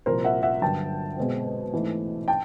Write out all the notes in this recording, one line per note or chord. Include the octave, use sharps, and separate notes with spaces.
C2 A#2 F3 A#4 C5
E5 F#5
E5 F#5
G2 D3 F#3 G5 A5
B2 G#3 C4
G#2 E3 A3 C4
G5 A5